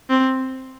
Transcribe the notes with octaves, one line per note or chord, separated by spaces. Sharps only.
C4